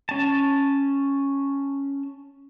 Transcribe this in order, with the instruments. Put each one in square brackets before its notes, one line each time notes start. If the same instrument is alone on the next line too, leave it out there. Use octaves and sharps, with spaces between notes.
[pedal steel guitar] C#4 A5